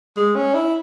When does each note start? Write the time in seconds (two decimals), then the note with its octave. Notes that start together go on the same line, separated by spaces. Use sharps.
0.17 G#3
0.36 C#4
0.55 E4